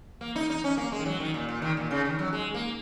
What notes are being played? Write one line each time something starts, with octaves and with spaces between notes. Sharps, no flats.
A#3
D#4
D#4
C#4
A#3
G#3
D#3
F#3
D#3
A#2
A#2
D#3
A#2
C#3
D#3
F#3
G#3
A#3